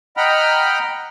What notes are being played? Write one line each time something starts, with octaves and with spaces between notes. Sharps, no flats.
D#5 F#5 G5 A#5 B5 F6